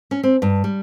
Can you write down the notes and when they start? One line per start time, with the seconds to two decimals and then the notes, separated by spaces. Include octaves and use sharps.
0.11 C#4
0.23 C4
0.42 G2
0.64 G3